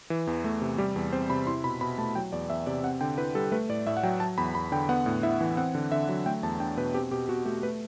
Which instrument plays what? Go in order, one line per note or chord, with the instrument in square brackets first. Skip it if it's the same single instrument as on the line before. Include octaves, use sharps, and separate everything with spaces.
[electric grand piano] E3
E2
A3
C3
G3 G4
E2
C4 C5
C3 B5
E4 C6
B2 B5
B2 B5
A3 A5
F#3 G5
E2 D5
E2 E5
C3 D5
C4 F#5
D3 G5
E4 B4
G3 A4
A3 B4
A2 D5
A2 E5
F#5
F#3 G5
F#3 A5
E2 B5
E2 B5
D3 G5
B3 F#5
A2
E4 E5
E3
C4 F#5
D3
D3 E5
F#3
A3 G5
E2 A5
D4 G5
B2 B4
C4 G4
B2 G4
B2 F#4
A3 G4
A3 B4